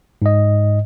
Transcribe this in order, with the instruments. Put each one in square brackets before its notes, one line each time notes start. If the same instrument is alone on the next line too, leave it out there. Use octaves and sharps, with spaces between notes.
[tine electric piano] G#2 D#5